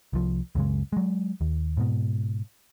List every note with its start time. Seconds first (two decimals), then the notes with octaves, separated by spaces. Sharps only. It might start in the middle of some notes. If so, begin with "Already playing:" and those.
0.13 C2 F3
0.55 C#2 F#2 C#3 G#3
0.93 F#3 G#3
1.41 D#2
1.77 G#2 B2